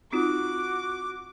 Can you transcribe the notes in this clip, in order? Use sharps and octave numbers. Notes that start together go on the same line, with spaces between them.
C4 D#4 F4 F#4 D6